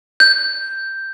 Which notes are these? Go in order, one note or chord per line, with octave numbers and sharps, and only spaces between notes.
G6